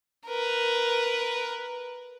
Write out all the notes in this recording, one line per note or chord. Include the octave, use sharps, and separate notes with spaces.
A#4 B4